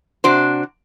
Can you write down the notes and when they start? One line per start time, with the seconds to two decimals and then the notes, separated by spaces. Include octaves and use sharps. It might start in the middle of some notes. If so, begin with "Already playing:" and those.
0.24 C3 D4 F#4 C5